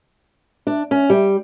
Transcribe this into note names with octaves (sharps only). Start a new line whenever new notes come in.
D4
C#4
G3